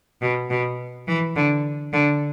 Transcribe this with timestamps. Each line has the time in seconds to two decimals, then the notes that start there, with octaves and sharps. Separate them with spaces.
0.22 B2
0.50 B2
1.07 E3
1.36 D3
1.93 D3